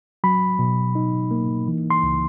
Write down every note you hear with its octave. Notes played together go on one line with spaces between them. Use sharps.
F#3 B5
B2
D#4
A#3
E3
C6
C#2